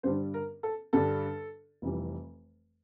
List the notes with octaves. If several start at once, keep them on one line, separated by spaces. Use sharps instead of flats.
G2 D3 G3 D4 C5
A#4
A4
G2 D3 G3 D4 A4
F1 F2 E3 G3